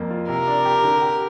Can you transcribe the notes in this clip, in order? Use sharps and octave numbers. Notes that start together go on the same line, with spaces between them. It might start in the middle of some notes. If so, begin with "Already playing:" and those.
Already playing: F2 A#3
F4
C3 A#4
D4
G4
D3
G4